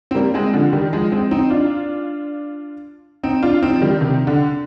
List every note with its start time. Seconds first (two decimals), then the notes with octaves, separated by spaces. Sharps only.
0.11 C4
0.15 G3 A#3
0.34 G#3 C4
0.53 D3 F3
0.73 D#3 G3
0.93 F3 G#3
1.12 G#3 C4
1.31 C4 D#4
1.50 D4 F4
3.23 C4 D#4
3.43 D4 F4
3.63 C4 D#4
3.75 F3
3.81 D#3 G3
4.01 C3 D#3
4.27 D3